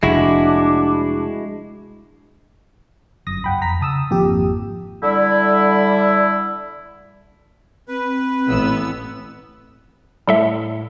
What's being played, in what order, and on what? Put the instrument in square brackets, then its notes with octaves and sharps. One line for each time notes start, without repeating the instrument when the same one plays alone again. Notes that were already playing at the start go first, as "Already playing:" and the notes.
[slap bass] F1 [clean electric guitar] G#3 E4 F#4 [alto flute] D4
[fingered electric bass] G1 [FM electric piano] F#2 D#6 A#6
[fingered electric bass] C#2 F#2 F#3 [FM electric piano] F#5 G5 B5
[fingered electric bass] F2 [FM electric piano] A#5 B6
[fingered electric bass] C#3 [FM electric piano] A5 D#6 E6
[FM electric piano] G#1 F2 G4 [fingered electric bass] A#3 C4
[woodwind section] D3 G3 E4
[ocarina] C4 [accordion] B4
[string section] A1 B3 E6
[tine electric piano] A2 [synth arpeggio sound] G3 A4 E5